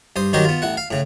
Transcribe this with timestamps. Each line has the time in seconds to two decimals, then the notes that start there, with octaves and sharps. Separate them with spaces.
0.16 G2 C5 D#6
0.33 D#3 F#3 F#4 G4 C5 D#5
0.45 B3 F4
0.62 A1 E4 F#5
0.77 F5
0.91 A2 C#3